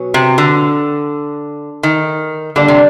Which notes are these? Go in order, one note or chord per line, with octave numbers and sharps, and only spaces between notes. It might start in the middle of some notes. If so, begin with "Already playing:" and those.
Already playing: B2 F#3 C#4
C3
D3
D#3
D3 G3 A#3 D4
C3